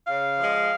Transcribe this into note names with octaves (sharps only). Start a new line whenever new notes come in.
C#3 F5
F3 G#3